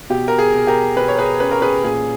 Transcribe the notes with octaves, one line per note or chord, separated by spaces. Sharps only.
B2 G4
A#4
G#4
B2
G4 A#4
B2 B4
C#5
G#4 B4
C#4 B4
A#4
G#4 B4
A#2 G#4